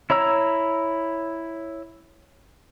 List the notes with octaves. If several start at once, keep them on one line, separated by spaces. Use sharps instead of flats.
E4 C#5 A#5 E6